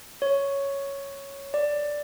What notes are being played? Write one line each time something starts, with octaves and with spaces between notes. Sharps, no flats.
C#5
D5